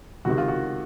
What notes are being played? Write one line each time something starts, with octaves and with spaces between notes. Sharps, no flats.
C#2 C3 D#3 F#4
F4
F#4